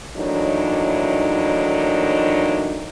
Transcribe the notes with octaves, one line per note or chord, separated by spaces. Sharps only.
D#2 A2 E3 F#3 D4 D#4